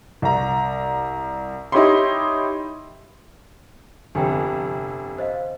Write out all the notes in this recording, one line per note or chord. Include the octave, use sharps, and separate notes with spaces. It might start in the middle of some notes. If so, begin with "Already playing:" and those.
C2 A#5
D#4 E4 G4 C#5 B5 C6
G1 F2 C3 G4 G5 G#5
C5 D#5 F5